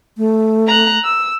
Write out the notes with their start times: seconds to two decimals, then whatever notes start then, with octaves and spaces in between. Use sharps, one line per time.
0.18 A3
0.67 A#5 F#6
1.04 E6